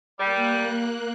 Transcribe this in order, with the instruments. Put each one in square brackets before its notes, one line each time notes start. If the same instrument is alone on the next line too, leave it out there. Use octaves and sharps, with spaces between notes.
[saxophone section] G3 [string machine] A#3 F#6